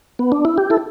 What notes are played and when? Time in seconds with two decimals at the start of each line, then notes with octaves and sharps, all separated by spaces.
0.19 B3
0.32 D4
0.45 E4
0.58 G4
0.70 E4 A4